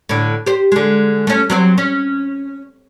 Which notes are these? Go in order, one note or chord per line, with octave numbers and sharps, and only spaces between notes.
A2 D3
G4 C5
D3 G#3
A3 C#4
F#3 C4 C5
C#4